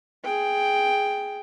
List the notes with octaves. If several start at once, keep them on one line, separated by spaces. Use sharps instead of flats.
G#4 G5